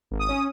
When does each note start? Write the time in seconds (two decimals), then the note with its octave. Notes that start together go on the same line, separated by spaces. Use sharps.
0.11 G#1
0.19 D#6
0.28 C#4